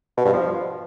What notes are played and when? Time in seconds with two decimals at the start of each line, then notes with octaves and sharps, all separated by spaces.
0.17 B2
0.25 G2
0.33 F3